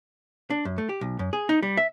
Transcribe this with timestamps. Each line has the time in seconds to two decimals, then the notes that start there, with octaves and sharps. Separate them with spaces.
0.50 D4
0.65 F#2
0.78 A3
0.89 G4
1.01 B1
1.19 F#2
1.33 G#4
1.49 D#4
1.63 G3
1.77 E5